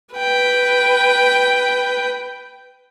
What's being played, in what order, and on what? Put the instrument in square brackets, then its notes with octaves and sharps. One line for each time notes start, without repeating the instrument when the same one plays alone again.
[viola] B4 G5